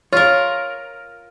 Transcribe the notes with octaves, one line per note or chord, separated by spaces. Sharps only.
F4 A#4 C#5